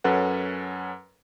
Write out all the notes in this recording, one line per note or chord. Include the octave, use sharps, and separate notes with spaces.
F#2 C#4 A4 B4 F#5